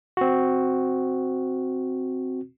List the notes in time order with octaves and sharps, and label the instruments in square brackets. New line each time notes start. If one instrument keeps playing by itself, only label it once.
[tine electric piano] C4 F#4